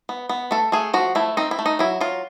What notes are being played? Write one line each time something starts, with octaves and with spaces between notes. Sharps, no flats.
B3
B3
A3 A4
A3 G#4
F3 F#4
A3 E4
C4 D#4
E4
A3
D#4
F#3 E4
F#3 F4